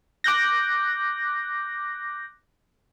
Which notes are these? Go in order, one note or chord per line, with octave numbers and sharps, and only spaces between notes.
D6 F#6 G6 A#6